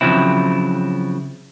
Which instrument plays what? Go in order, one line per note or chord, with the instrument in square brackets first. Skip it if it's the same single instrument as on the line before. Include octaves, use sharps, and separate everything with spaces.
[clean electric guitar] C#3 F3 F#3 C4 E4